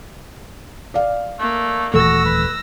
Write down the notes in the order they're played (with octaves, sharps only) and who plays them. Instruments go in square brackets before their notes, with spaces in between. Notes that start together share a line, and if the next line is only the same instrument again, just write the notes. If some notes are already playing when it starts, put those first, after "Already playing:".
[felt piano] D5 F5
[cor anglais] A3 [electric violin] A#3
[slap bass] D#1 E3 A3 [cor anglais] F#4 [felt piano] A4 [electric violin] E6 A#6
[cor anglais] B4